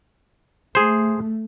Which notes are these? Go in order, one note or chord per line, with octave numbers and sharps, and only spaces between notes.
A3 G#4 C5